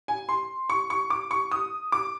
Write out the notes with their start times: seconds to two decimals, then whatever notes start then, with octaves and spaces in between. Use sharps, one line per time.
0.08 G#5
0.29 C6
0.70 C#6
0.90 C#6
1.10 D6
1.31 C#6
1.52 D#6
1.92 D6